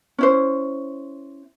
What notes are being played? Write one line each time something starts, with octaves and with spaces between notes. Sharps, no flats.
C#4 E4 C5